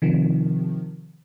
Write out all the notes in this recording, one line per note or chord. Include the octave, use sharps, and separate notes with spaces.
C3 D#3 F3